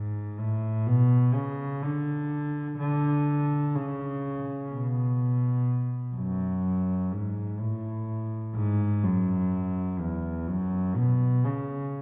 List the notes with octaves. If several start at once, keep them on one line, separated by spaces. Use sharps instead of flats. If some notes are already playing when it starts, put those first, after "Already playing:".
Already playing: G#2
A2
B2
C#3
D3
D3
C#3
B2
F#2
G#2
A2
G#2
F#2
E2
F#2
B2
C#3